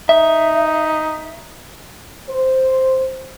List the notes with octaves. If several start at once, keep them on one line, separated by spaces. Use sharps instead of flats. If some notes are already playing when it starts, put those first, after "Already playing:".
D#4 E5
C5